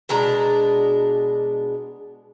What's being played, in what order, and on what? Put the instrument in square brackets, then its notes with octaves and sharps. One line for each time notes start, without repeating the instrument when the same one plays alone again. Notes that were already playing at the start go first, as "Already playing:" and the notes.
[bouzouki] B2 G#3 D4 A#5